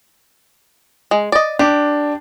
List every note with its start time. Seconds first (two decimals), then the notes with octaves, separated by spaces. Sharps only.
1.11 G#3
1.32 D5 D#5
1.59 D4 G4